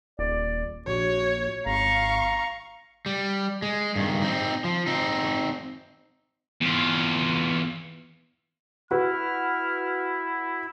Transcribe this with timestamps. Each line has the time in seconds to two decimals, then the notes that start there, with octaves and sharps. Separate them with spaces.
0.19 D#1 D5
0.87 A#1 F#4 C#5
1.66 G#1 F5 A#5 C#6
3.06 G3
3.62 G#3
3.96 G2 D#3
4.22 C4 D#4
4.64 F3
4.87 C4 D#4
6.61 E2 F4
8.91 E4 F#4 B4 F6